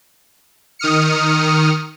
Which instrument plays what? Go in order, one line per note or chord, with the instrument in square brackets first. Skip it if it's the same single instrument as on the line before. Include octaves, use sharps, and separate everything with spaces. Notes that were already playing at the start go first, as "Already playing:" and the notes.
[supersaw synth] D#3 D#6 F6 C#7